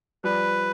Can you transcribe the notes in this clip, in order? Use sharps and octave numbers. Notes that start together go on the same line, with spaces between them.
F3 G3 B4